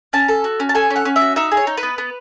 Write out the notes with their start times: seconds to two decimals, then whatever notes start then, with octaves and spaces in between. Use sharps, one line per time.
0.13 C#4 A5
0.28 A4
0.44 F#4
0.60 C#4
0.69 A5
0.75 A4 G#5
0.90 C#4
0.96 F#5
1.05 C#4
1.16 E5
1.22 F#4
1.36 D#4 E5
1.52 G#4
1.57 C#5
1.67 D#4
1.77 B4
1.83 B3
1.98 B3